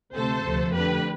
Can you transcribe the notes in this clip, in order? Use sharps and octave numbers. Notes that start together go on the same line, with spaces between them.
D2 C3 F3 A3 A4 C5
D2 C3 F3 A3
F2 D3 A3 G4 B4